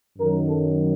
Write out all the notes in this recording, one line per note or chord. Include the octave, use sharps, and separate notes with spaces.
F#2 D#3 F#3 A#4
A4